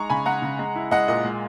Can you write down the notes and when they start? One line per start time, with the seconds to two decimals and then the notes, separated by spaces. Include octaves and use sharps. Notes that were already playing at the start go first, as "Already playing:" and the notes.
Already playing: G#3 D#4 A#5 C#6
0.10 C#3 G#5 B5
0.26 G#3 F#5 A#5
0.42 C#3
0.59 G#3
0.76 E4
0.91 G#3 D#5 F#5
1.08 A#2 D#5
1.25 G#3